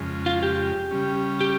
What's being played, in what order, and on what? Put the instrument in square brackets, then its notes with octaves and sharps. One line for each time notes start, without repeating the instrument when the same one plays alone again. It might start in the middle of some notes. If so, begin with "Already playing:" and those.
Already playing: [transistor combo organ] F2 C#3 G#3
[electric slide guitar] F4
G4
[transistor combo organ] C#3 G3 C#4
[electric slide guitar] G4